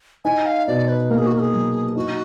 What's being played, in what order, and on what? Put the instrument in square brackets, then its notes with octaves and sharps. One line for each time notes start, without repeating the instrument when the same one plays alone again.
[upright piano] D#4 [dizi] G#5
[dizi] F5
[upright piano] B2 [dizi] D5
[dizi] B4
[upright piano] A#3 [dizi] A#4
[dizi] G#4
F#4
A#4
G#4
[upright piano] F#3
[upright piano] D#4 [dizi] F#4